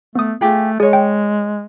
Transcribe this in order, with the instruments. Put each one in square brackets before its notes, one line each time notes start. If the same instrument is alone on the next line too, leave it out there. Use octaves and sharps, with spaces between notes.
[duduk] A3 [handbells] B3 D#6
[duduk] A3 [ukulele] F4 G4 G#4
[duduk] G#3 [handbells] G#4 [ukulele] C#5 D#5
[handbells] G5